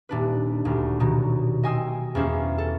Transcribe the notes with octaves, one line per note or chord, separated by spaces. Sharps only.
D#1 D4 B4
D#1 D2
B2 D#3 F#3
D#5 G5 G#5 C6 D#6 E6
E2 A#3 C#4 C5
A4